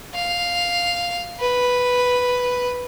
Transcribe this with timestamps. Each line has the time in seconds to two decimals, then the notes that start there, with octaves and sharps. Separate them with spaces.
0.15 F5
1.40 B4